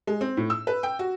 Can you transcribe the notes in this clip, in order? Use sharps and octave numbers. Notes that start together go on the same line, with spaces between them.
G#3
C4
A2
E6
B4
G5
F#4